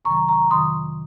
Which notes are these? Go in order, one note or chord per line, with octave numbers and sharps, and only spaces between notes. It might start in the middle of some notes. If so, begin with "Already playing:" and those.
F2 C3 D#3 F#3 A#5 C#6
A#5 C#6
F2 C3 D#3 F#3 C6 D#6